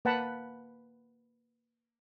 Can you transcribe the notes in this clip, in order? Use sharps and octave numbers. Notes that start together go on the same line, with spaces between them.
A#3 B4 F#5 A5 B5